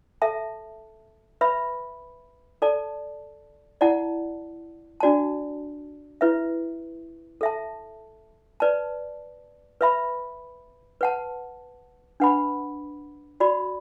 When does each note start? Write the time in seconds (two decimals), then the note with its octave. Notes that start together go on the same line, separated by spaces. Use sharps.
0.22 A4 E5 A5
1.41 B4 E5 B5
2.62 A4 D5 A5
3.81 E4 D5 F#5 A5
5.00 D4 F#4 D5 A5
6.21 E4 B4 E5
7.41 A4 E5 A5
8.60 B4 D5 A5
9.81 B4 E5 B5
11.01 B4 F#5 A5
12.20 D4 B4 F#5 B5
13.40 F#4 D5 B5